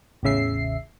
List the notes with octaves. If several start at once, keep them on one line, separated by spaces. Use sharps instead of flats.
A1 E2 C#3 E5 C7